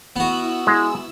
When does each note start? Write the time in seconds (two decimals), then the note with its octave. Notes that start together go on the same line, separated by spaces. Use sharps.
0.16 B3 E4 F#4 E6
0.67 G#3